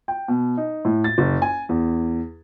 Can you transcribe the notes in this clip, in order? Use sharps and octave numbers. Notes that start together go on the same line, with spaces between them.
G5
B2
D#4
A2
A6
F#1
G#5
E2